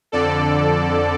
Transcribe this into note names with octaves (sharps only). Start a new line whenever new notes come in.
F2 D3 A4 D5